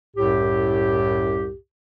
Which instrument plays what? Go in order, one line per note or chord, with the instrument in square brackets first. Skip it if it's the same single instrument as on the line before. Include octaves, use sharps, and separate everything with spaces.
[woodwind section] C2 F#2 A2 G4